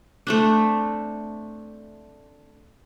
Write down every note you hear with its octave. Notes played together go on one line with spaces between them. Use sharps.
A3 C4 D4